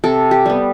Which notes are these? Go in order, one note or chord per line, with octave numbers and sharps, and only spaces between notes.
C3 A4
G4
G3 B3